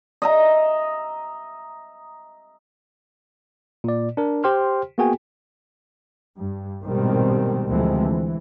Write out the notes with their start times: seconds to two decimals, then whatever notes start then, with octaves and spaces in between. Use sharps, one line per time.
0.22 D#5 E5 A#5
3.84 A#2 D5
4.17 D4 A#4
4.44 G4 C5 G5 C6 F6
4.98 A#3 B3 F#4 G#4 G5 G#5
6.38 G2
6.82 A#1 G#2 B2 D#3 G3 C4
7.67 D2 C3 E3 F3 G#3 C4
8.00 E3